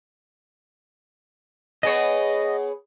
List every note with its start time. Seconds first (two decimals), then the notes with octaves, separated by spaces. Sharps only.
1.83 B3 G#4 C#5 D#5